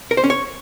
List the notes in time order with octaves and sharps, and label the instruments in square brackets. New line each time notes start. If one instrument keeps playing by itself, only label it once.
[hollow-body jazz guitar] A#4
C5
C#4
C#5